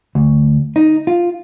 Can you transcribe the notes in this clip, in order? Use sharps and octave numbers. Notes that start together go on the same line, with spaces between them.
D2
D#4
F4